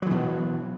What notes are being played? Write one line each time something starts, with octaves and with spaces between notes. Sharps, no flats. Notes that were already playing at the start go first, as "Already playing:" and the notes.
B2 E3 F#3